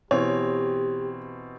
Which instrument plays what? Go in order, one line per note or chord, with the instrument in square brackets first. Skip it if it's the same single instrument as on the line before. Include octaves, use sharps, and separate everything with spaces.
[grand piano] B2 E3 C4 [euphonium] G4 [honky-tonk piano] C#5